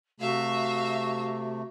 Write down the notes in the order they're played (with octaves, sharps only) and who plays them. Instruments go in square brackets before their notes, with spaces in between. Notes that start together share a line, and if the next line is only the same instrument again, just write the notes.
[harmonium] C3 A3 [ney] F#4 [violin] E5 F5